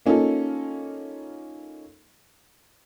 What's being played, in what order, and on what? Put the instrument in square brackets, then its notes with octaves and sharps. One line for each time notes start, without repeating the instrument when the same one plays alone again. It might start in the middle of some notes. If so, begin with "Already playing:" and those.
[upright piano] A#3 C#4 D#4 F4 A4